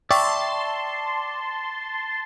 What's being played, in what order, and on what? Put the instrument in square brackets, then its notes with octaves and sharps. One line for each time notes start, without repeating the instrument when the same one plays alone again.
[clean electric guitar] D5 E5 [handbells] G5 C#6 [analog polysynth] A5 C6